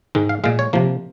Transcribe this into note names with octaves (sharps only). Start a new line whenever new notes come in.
G#2 D#3 G#3
F5
A#2 G#3 F5
C#5
C3 F3 A#3